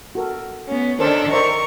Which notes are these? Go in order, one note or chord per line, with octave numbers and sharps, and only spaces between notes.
F#4 A4 A#4
B3 C#4
D#3 D4 A4 A#4 C5 D5
A#4 C5 D5 E5 C#6